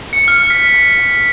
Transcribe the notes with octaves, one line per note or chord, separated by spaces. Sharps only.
C#7
F6
B6